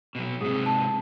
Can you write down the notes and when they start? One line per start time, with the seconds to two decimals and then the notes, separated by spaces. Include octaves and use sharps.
0.15 B2 F#3
0.41 G#2 C3 G#4 D#6
0.66 A5